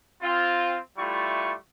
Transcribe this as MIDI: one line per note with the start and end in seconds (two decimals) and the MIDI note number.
0.22 0.77 60
0.22 0.77 65
0.98 1.53 55
0.98 1.53 57
0.98 1.53 64
0.98 1.53 65
0.98 1.53 85